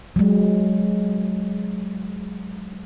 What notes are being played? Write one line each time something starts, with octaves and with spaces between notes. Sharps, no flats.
F#3 G#3